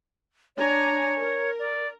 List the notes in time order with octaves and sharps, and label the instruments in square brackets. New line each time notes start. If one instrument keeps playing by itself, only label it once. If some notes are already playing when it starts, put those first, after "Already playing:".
[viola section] D4 G#5 A#5 [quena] C#5
[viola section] A#4
[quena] D5